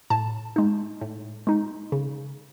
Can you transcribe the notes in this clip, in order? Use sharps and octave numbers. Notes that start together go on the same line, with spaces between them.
A2 A5
G#3 D#4
A2
G#3 D#4
C#3